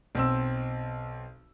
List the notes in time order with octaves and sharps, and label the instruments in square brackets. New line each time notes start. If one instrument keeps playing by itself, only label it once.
[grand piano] B1 C4 E6